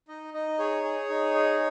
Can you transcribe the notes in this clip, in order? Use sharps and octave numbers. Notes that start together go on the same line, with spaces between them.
D#4 D#5
D#4 D#5
G#4 C#5
G#4
D#4
G#4